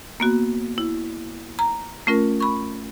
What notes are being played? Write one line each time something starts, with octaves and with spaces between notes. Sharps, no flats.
A#3 B3 F#4
E4
A#5
A3 C#4 F4 A#4
B5 C#6